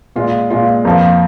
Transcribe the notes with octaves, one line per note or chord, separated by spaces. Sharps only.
A#2 G#3 F4
A#2 G#3 F4
F2 F3 A#3